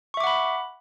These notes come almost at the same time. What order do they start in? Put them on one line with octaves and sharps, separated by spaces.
C#6 E5 D6 F#5 B5